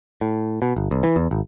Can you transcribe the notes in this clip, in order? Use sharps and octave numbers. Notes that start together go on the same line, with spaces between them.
A2
B2
G1
C2
E3
E2
G#1